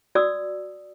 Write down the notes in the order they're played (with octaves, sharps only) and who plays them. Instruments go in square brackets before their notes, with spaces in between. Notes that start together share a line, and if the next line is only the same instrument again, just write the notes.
[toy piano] F#4 D5 D#6 E6